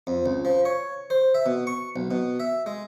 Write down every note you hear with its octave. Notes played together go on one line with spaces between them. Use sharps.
F2
C#2
F3
C#5
C5
E5
B2
C#6
B1
B2
E5
G#3